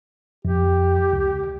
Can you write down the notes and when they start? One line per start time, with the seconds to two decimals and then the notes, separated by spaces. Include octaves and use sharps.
0.45 F2 G4
1.13 C#2